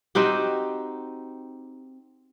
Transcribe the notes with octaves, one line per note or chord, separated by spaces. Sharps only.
C4 D#4 F#4 G4